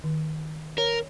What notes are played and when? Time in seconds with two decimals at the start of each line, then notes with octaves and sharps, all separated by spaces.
0.04 D#3
0.78 A#4 C#5